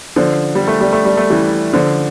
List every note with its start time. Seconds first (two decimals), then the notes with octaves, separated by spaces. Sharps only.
0.16 D3 F3
0.55 G3
0.68 A3
0.81 G3
0.93 A3
1.05 G3
1.17 A3
1.30 E3 G3
1.74 D3 F3